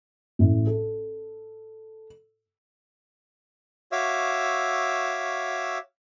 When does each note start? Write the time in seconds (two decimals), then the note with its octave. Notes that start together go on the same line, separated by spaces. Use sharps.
0.39 A1 A2
0.67 A4
3.92 F#4 C#5 E5 F5 D6 E6